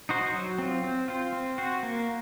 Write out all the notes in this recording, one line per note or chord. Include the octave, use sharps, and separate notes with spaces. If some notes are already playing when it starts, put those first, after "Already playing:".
D#4 F#4 C5
F#3
C4 F4
C4
F4 C5
C4
F#4 C5
A#3